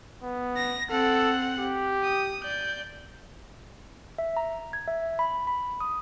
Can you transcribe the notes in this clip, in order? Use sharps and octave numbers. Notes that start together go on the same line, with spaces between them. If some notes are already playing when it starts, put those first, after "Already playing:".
B3
A#6
C4 A4 F#5
G4
D#6
D5 G6
E5
A#5
G#6
E5
B5
B5
D#6